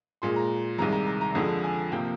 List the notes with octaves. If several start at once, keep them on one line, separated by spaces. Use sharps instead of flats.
A#2 G#3 C6
A#5
C2 C3 D#3 G#3 A#5
A#5
A#5
A#5
F2 D3 F3 G#3
G#5
C3 F3 A#3 G5